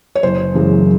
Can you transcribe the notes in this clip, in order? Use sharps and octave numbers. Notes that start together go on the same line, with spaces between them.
C#5
F#1 C5
F#2 C#3 E3 G#3